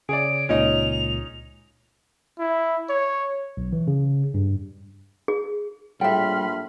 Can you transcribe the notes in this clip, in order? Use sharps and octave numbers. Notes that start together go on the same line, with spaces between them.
C#3 G#4 C#5 D5 D7
C#2 A#2 C#4 D#4 D#5 F7
E4
C#5
B1
E3
C#3
G2
G#4
A#1 A2 G3 E5 G5 B5 C6 F6